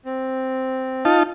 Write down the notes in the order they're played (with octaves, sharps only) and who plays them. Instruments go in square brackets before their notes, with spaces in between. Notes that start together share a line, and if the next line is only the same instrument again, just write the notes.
[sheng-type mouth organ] C4
[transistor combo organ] D#4 F4 A5